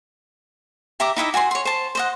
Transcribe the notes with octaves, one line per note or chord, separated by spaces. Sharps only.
G4 E5 A#5 D6
D#4 E4 D#5 E5
F#4 G#5 A#5 C6
C#5 C6
C5 A5
C5 D#5 F#5